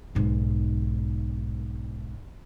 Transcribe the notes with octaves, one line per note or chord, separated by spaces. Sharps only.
B1 G#2